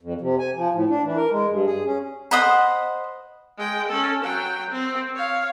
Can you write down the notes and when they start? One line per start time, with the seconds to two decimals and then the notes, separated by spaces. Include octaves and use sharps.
0.01 F2
0.21 C3
0.39 G#5
0.56 F3
0.74 A2
0.89 D4
1.05 E3
1.17 A#4
1.32 G#3
1.49 G2
1.66 G#4
1.86 C#4
2.31 C5 D#5 F#5 B5
3.58 G#3 G5
3.88 C#4 A4
4.24 F#3 G5
4.70 C4
5.15 C#5 F5